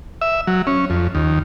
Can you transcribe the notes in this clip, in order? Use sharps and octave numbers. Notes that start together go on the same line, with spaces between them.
E5
F#3
C#4
F2
D#2